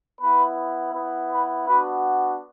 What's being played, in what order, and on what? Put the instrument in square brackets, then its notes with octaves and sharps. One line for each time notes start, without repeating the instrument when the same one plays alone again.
[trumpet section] B3 E4 B4
B3 E4
B4
B3 D4 F#4 B4